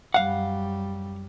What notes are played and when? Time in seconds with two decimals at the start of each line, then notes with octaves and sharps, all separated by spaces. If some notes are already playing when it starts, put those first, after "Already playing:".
0.14 F#2 G3 F5 F#5